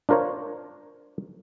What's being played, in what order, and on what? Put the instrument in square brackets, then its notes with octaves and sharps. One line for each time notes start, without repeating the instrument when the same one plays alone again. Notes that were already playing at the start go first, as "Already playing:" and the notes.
[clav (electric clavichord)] D4 F4 A#4 C5 C#5